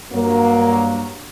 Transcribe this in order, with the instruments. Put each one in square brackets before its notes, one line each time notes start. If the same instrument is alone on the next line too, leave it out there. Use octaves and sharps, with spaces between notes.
[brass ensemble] G2 F#3 A#3